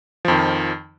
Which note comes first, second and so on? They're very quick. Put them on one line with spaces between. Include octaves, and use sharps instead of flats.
F3 F2 D#3